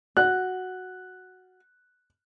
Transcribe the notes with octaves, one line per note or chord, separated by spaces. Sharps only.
F#4 F#6